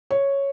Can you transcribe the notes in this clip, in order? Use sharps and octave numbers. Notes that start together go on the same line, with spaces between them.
C#5